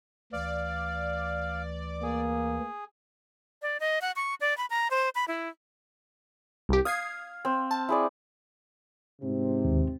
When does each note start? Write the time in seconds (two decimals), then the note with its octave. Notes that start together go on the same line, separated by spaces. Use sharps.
0.33 D2 E3 D5 F5
2.03 A#3 G#4
3.62 D5
3.80 D#5
4.01 F#5
4.16 C#6
4.41 D5
4.57 B5
4.70 A#5
4.91 C5
5.15 B5
5.28 E4
6.69 C2 G4
6.85 F5 D#6 G#6 C7
7.45 C4
7.71 A5
7.89 E4 G#4 D5
9.22 G#2 C3 C4
9.65 D#2